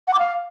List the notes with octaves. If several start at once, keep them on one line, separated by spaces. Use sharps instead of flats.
F#5
D6
F5